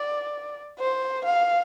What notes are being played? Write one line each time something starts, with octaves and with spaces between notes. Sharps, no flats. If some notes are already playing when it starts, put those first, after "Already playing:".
Already playing: D5
C5
F5